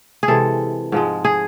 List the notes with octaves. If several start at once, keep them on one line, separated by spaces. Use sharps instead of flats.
G#4
C3 E3 G#3 A4
G#2 F3 G#3
G#4